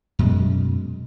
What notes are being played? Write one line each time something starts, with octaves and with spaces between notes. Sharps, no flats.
F#2 B2 G#3